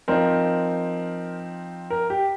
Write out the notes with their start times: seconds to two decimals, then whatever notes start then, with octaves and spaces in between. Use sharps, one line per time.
0.08 F3 C4 D#4 A#4
1.90 A#4
2.10 G4